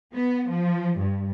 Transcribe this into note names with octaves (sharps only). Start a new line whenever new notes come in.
B3
F3
G2